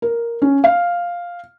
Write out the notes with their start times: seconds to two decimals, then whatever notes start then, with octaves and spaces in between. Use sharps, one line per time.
0.02 A#4
0.42 C#4
0.64 F5